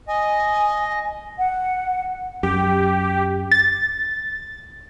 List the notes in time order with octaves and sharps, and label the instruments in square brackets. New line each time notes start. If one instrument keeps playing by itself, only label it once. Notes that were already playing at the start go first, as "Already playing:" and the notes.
[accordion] D#5 [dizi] G#5
[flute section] F#5
[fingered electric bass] F#2 [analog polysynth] G4
[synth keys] A6